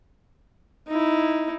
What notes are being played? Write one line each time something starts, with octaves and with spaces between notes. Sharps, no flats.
D#4 E4